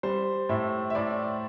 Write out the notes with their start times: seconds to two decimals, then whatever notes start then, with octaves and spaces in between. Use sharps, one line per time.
0.03 G3 C5
0.49 A2 E5
0.90 E5
0.95 A2 D5